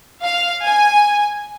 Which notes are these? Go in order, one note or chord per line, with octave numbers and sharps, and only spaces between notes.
F5
G#5